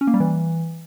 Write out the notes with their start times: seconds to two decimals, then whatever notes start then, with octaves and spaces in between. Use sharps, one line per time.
0.01 C#4
0.07 A#3
0.14 G3
0.20 E3